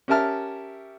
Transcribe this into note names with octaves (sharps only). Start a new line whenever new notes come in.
C#4 G4 A#4 E5 A5 F6